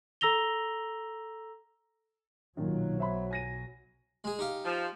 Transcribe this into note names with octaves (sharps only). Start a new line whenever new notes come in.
A4 A#5 E6 A#6 F7 G7
B1 A#2 D#3 F#3
C5 E5 B5
G#5 A#6 D#7
G#3 G#4
D#4 G4 F5
F3